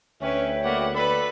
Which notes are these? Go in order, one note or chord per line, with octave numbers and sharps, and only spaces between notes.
D2 C#4 B4 C#5 E5 G5
A#3 F#4 B4 D5 F#5
A4 B4 D5 B5